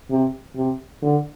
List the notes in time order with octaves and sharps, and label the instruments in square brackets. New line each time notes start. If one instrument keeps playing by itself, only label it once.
[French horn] C3
C3
D3